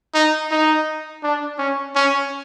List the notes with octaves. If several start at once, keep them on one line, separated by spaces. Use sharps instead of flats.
D#4
D#4
D4
C#4
C#4